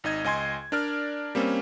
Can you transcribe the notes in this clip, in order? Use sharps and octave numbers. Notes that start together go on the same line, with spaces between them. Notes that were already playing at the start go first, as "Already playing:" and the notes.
G#1 D#4 D#5 G#6
C#2 D#5 G#5 C6 G#6
D4 A#4 D5 F6
G3 A#3 C4 C#4